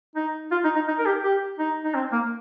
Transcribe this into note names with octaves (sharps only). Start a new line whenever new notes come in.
D#4
F4
D#4
D#4
D#4
A#4
G4
G4
D#4
D#4
C4
A#3